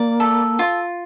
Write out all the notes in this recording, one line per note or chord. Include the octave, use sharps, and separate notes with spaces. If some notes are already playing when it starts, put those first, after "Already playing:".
Already playing: A#3 D5
A4
F4